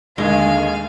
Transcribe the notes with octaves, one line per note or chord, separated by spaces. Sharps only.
D#2 D3 D#3 G#3 F5 G#5